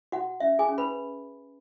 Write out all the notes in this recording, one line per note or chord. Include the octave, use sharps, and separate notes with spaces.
F#4 F#5
C#4 E5
G#4 G#5
C#4
B4 B5